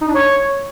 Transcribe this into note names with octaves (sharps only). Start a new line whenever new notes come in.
D#4
D4
C#5